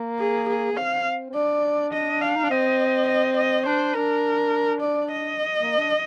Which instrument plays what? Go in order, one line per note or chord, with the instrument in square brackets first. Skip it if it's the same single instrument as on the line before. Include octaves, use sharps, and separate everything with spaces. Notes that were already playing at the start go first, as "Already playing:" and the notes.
Already playing: [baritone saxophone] A#3
[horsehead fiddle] G#4
G#4
[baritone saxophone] A#3
[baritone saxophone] C4 [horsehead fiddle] F5
[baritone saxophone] C4
[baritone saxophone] D4 [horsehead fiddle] D5
[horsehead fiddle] D#5
F5
[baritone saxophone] D#4
D4
[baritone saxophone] C4 [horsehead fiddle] D#5
[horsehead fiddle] D#5
D#5
[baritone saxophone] D4 [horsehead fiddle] C5
[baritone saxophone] D4 [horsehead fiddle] A#4
[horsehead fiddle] D5
D#5
[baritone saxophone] A#3
D4